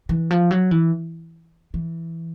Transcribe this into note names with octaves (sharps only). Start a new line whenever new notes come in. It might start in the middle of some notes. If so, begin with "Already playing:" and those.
E3
F3
F#3
E3
E3